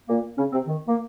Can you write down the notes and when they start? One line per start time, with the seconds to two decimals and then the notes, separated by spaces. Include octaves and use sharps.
0.08 A#2 A#3
0.38 C#3 C#4
0.53 C3 C4
0.67 D#3
0.88 A#3